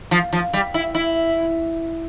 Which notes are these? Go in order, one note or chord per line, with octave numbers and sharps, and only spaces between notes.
F3
F3
G3
E4
E4